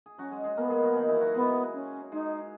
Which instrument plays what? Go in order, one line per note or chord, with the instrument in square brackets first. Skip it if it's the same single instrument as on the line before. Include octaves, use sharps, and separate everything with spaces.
[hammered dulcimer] G#4
[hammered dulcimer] F#3 F#4 [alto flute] C#4
[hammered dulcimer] G#3 G#4
G#3 G#4
[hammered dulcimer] A#3 A#4 [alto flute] B3
[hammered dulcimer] G#3 G#4
F#3 F#4
D#3 D#4
E3 E4
F#3 F#4
[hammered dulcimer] G#3 G#4 [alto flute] B3
[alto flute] C#4
[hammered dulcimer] G#3 G#4 [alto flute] D#4